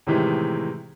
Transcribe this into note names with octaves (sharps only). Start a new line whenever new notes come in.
A2 C3 D#3 E3 G#3